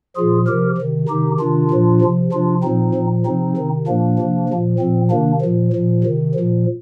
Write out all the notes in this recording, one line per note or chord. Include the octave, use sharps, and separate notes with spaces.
A#2 F3 F4 G#4
C3 F3 G4 A#4
C3 D#3
C3 D#3 D#4 G4
C3 D#3 D4 F4
A#2 F3
C3 F3
C3 F3 D4 F4
A#2 F3 C4 D#4
A#2 F3
C3 F3 C4 D#4
C3 D#3
A#2 F3 A#3 D4
C3 F3
A#2 F3
A#2 F3 C4
C3 D#3 A#3 D4
A#2 F3
A#2 F3
C3 D#3
A#2 F3